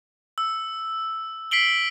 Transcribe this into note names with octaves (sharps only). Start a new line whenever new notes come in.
E6
B6 C7 D7 F#7 G7